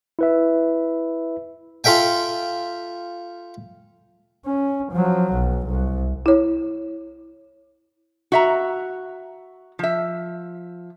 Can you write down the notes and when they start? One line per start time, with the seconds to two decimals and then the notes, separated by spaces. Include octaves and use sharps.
0.19 E4 B4 E5
1.84 F4 A4 E5 G5 G#5
4.46 C#4
4.92 F3 F#3
5.33 B1
5.66 C2
6.26 E4 C#5
8.32 F#4 E5 A#5
9.79 F3 E5